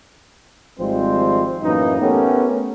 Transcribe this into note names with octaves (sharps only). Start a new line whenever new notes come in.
G#1 F3 G3 G#3 C4 C5
F#2 A2 E3 A#3 D#4
A3 B3 C#4 G4 A#4